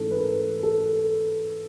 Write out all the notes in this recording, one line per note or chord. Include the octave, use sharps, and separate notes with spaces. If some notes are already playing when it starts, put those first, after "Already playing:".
Already playing: G#2 E3 A3 C#4 A4
B4
A#4
A4